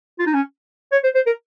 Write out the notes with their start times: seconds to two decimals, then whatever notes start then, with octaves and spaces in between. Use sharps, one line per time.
0.19 F4
0.27 D#4
0.34 C#4
0.92 C#5
1.04 C5
1.15 C5
1.26 A#4